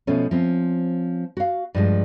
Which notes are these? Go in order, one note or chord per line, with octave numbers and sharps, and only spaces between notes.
B2 F3 A3 C#4
F3 C4 C#4
F#4 F5
G2 F3 G#3